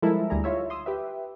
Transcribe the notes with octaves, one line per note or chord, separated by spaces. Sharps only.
F3 G3 G#3 E4 A4 A#4
D2 G3 E4 G#4 A#5
D#4 F4 C#5 E5
C6 D#6 E6
G4 B4 E5